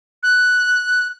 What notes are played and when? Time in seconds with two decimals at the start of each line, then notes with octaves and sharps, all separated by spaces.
0.23 F#6